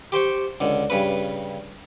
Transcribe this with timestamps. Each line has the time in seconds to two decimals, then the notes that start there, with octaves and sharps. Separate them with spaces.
0.12 G4 C5 G5 C#6
0.61 C#2 D3
0.90 G2 C#3 B4